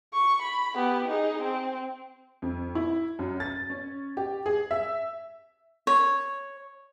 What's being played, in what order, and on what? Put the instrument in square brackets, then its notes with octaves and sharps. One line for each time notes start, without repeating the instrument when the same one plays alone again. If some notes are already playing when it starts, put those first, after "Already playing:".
[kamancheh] C#6
B5
B3 G4
D#4 G#4
C4
[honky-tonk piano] F2
E4
F#2
A6
C#4
G4
G#4
E5
[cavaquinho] C#5